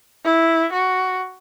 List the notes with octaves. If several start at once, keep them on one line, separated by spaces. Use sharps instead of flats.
E4
F#4